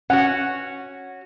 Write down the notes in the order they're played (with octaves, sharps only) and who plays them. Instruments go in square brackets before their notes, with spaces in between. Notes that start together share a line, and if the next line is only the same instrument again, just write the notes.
[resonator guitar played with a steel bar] C#4 F#4 [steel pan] F#5